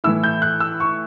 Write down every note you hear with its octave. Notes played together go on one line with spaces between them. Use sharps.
A2 E3 A3 E4 E6
G6
F#6
E6
C#6